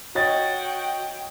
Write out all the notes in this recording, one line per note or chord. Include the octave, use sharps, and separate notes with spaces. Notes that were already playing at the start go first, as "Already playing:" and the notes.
F#4 C#5 D#5 G5 A6